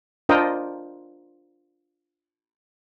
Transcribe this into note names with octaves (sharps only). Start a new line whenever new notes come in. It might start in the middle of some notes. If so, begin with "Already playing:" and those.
D4 F4 A#4 C5 D#5 G5